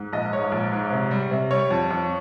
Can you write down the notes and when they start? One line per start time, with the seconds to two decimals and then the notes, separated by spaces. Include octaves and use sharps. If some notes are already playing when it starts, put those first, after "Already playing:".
Already playing: G#2
0.13 A#1 D#5
0.33 G#2 C#5
0.52 A#1
0.72 G#2
0.92 C3
1.11 G3
1.31 C3
1.51 G3 C#5
1.71 F2
1.91 F2